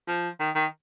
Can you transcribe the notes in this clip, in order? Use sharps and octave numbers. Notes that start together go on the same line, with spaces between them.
F3
D#3
D#3